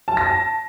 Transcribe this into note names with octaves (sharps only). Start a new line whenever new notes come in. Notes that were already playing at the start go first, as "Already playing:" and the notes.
A5
A#6
A5